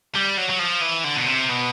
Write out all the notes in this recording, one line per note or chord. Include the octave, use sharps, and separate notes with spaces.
G3
F#3
F#3
F3
E3
D3
B2
C3
B2